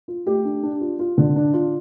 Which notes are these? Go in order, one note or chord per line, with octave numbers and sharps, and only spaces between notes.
F4
A3 G4
D4
D4
F4
F4
D3
D4
F4